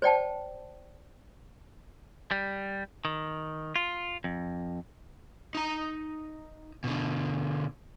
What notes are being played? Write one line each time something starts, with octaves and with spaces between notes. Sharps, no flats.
C5 D5 G5 A5
G3
D#3
F4
F2
D#4 A#5
B2 D3